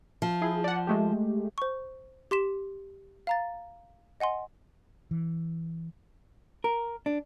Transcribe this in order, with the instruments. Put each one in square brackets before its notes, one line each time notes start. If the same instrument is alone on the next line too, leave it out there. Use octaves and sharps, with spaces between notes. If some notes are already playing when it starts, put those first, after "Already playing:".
[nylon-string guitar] F3
[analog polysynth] E4 G#4
D5 F#5
G#3 A3 G4
[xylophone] C5 C#6
G4 C6 B6 E7
F5 A#5 A6
D#5 F#5 G#5 C6
[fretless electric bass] E3
[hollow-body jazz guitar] A#4
D4